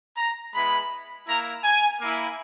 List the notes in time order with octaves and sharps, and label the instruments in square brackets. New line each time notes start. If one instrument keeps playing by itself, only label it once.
[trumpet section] A#5
G#3 B3 E4 B5
A#3 E4 A#5
G#5
A#3 E4